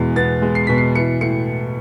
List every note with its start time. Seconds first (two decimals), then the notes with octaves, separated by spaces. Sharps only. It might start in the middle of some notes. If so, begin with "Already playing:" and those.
Already playing: E2 B2 G#3
0.16 B3 A6
0.42 G#3
0.55 C7
0.67 B2 B6
0.78 C7
0.95 E3 C#7
1.21 A2 C#7